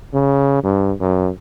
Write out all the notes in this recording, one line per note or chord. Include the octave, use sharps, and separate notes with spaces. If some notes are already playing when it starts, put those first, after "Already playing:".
C#3
G2
F#2